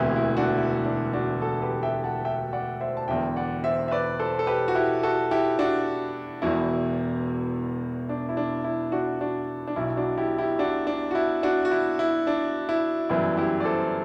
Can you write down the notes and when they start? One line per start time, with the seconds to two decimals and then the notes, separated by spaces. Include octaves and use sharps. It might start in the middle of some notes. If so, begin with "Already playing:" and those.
Already playing: E1 D2 C3 E3 E4
0.16 E4
0.37 D4 F#4
0.58 E4
0.85 D4
1.13 D4 F#4
1.41 F#4 A4
1.62 G4 B4
1.83 E5 G5
2.04 F#5 A5
2.25 E5 G5
2.53 D5 F#5
2.81 C5 E5
2.97 A5
3.08 E1 E2 D3 E5 G5
3.36 D5 F#5
3.64 C5 E5
3.88 E5
3.91 B4 D5
4.19 A4 C5
4.39 A4
4.47 G4 B4
4.68 F#4
4.75 E4 G4
5.03 F#4 A4
5.31 E4 G4
5.59 D4 F#4
6.42 E1 E2 B2 E4
8.09 D4
8.29 E4
8.37 D4
8.64 E4
8.92 D4 F#4
9.20 D4 F#4
9.67 D4
9.76 B1 B2 E4
9.97 D4 F#4
10.18 E4 G4
10.38 E4 G4
10.59 D4 F#4
10.87 D4
11.11 F#4
11.15 E4
11.43 D4 F#4
11.65 F#4
11.71 E4
11.99 E4
12.27 D4
12.69 E4
13.09 G1 F#2 E3 E4
13.37 E4 G4
13.60 D5
13.65 A4 C5